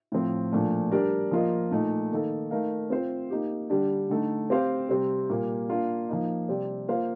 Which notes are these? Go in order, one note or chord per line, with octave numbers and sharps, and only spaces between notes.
A2 F3 C4
A#2 F3 A3 D4
G3 D4 G4 A#4 D5
F3 A#3 F4 A#4 D#5
A#2 A3 D#4
D#3 A#3 D#4 A4
A3 D#4 A#4 F5
C4 F4 C5
A#3 D#4 G4
D3 G3 D4 G4
D3 A3 D#4 A4
C4 G4 C5 F5
C3 G3 C4
A#2 G3 A#3
A#3 D4 F4
F3 A#3 D#4
C3 G3 C4 G4 D5
A#3 F4 C5 F5